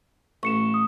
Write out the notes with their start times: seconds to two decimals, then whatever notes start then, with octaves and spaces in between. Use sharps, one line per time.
0.43 A1 C#6 C#7 E7
0.74 D#6